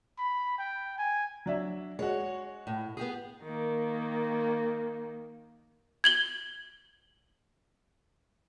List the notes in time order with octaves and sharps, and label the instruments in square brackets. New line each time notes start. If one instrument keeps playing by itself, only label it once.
[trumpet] B5
G5
G#5
[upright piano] F#3 D4 E5
[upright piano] G#3 F#4 [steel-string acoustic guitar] C#5
[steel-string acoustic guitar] A2
B3 G4 G#4
[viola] D#3 A#3
[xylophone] G#6 F#7 G7